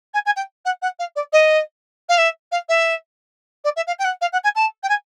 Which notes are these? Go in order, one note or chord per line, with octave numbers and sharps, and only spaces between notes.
G#5
G#5
G5
F#5
F#5
F5
D5
D#5
F5
E5
F5
E5
D5
E5
F5
G5
F#5
F5
F#5
G#5
A5
G5
G#5